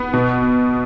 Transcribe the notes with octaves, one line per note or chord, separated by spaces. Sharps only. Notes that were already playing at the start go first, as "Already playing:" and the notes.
Already playing: B3
B2